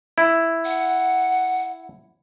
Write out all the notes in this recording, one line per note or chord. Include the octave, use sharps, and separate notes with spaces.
E4
F#5